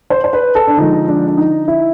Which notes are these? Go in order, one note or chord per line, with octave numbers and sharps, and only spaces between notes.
C5
C5
B4
A4
D4
D3 F3 G#3 D#4
D4
D4
D#4
E4